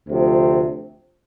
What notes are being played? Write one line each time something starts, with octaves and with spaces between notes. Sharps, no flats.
D2 C3 F3